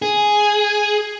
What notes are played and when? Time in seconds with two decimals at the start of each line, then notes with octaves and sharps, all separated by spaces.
0.02 G#4